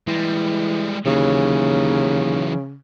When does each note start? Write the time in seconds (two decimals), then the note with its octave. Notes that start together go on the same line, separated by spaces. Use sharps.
0.07 E3 G3 G#3
1.06 D#2 C#3 E3 F#3